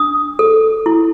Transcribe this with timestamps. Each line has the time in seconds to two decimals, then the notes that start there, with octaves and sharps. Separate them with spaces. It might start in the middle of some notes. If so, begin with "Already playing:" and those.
Already playing: D4 D#6
0.39 A4
0.86 E4